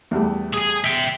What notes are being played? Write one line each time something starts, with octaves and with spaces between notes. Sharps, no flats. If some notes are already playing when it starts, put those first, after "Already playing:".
E2 G3 A3
G#4 G#5
E5 G5